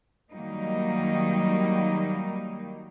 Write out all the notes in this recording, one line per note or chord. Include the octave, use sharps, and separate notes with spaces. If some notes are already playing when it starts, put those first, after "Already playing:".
D#3 F#3 G3 A#3 D#4